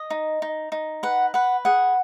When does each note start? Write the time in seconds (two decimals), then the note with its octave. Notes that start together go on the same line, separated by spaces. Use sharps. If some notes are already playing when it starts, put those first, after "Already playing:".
Already playing: D#5
0.10 D#4
0.42 D#4
0.72 D#4
1.03 B4 F#5
1.34 B4 F#5
1.65 G#4 F#5